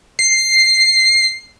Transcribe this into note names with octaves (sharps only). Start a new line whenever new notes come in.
C7